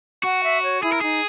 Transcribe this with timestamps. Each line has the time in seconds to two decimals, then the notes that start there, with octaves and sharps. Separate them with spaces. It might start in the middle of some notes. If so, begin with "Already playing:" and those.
0.23 F#4 F#5
0.44 E5
0.63 C#5
0.83 E4 G#4
0.92 A#4
1.01 D#4 G#4